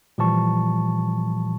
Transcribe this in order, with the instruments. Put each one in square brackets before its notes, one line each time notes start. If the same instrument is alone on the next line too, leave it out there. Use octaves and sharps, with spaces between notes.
[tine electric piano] A#2 E3 F3 G3 A5 C#6